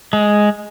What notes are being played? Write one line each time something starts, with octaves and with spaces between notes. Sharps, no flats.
G#3